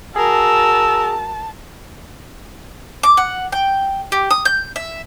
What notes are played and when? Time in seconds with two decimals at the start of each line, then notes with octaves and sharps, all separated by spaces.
0.16 F#4 G#4 A#4 A5 E6
3.03 D6
3.17 F#5
3.52 G5
4.12 G4
4.31 D#6
4.45 G6
4.76 E5